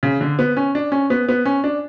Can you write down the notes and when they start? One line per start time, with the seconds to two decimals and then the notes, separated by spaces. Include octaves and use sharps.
0.03 C#3
0.21 D3
0.39 B3
0.57 C#4
0.75 D4
0.92 C#4
1.10 B3
1.29 B3
1.46 C#4
1.64 D4